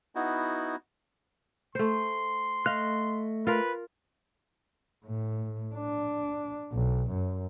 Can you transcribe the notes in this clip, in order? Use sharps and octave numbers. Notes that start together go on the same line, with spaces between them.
B3 D#4 E4 F#4
A3 C5 C6
A3 D#5 F5 F#6
F4 A#4 B4
A2
D4
B1
F#2